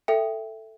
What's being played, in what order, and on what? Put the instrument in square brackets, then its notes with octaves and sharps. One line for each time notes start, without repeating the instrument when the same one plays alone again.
[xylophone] A4 E5 G5